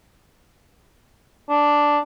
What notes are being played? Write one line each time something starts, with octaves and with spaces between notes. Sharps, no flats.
D4